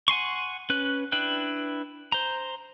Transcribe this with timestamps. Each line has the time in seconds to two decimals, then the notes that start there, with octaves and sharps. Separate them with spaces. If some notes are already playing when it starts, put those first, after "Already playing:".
0.08 F#5 G#5 C6 C#6
0.70 C#4 B4 F#6
1.12 D4 E4 B4 G5 F#6
2.12 C5 A#5